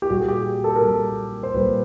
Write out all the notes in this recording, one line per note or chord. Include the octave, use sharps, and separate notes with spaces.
G4
A#2 G3 A#3 F#4
G#4
G4
A4
A#4
A#2 G3 A#3 A4
C5
A#2 G3 A#3 B4